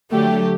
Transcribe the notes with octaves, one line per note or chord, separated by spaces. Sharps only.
D3 F#3 A3 G4